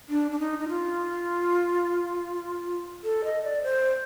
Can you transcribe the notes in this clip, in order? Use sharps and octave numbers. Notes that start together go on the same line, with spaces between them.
D4
D4
D#4
D#4
F4
A4
D#5
D5
C5